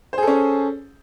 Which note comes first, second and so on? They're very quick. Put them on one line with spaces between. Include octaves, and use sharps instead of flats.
C5 G#4 A4 C#4